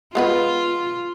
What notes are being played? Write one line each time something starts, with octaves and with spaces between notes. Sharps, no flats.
G#3 B3 F4 B4